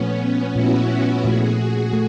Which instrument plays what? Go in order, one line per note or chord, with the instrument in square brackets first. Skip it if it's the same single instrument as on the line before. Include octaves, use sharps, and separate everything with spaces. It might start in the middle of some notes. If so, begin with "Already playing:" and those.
Already playing: [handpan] A#2 F3 A3 [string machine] B3 C#4
[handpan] A#2 F3 A3 [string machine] E4 F#4
[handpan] A#2 F3 A3 [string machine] F#4 G#4
[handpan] A3